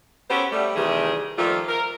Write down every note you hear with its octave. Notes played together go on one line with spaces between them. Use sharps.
B3 C#4 F#4 G4 A4 C5
G3 A3
C3 D#3 E3 G3 A3 G#4
D#3 F3 G3 A3 A#3 F4
A#4